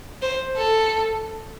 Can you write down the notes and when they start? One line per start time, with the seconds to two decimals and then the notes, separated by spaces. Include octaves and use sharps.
0.22 C5
0.57 A4